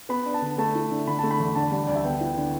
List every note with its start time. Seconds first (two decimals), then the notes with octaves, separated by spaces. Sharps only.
0.09 B3 B5
0.26 D4
0.34 A5
0.42 D3
0.58 A3 A5
0.75 E4
0.91 D3
1.07 D3 B5
1.19 A3 A5
1.31 B5
1.40 E2
1.55 D3 A5
1.72 G3
1.87 D2 D5
1.96 E5
2.04 B3 G5
2.21 E4
2.37 D3